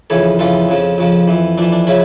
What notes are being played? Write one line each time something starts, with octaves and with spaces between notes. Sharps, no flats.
F2 C#3 E3 A4 C#5
F2 C#3 E3 F4 A4
F2 C#3 F3
F2 C#3 F3
F2 E3
F2 E3 D4
D4
C#3 F3 C#4 E4